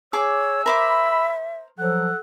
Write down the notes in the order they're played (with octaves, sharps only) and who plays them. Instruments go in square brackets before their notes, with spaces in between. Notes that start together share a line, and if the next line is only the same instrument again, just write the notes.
[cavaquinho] G#4 D6 [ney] C#5 [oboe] E6
[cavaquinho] A#4 C5 D6 [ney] E5 [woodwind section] B5
[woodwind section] F3 F#3 [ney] A4 [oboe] F#5